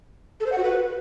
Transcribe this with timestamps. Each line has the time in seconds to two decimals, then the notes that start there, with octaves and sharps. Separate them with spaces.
0.40 A4
0.46 C5
0.52 F#5
0.58 F#4
0.64 B4